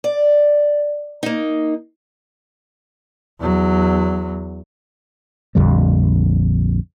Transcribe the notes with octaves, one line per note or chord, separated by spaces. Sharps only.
D5
A#3 D#4
E2 F#3
A#1 F2 D3 G3